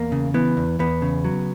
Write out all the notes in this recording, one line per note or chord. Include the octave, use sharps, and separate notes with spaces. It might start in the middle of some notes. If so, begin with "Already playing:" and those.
Already playing: E2 A#3
C#3
E3 B3
E2
E2 B3
C#3
F#3